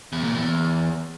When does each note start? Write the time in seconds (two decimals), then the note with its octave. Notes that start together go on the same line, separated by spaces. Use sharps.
0.13 E2
0.24 A#2
0.35 E2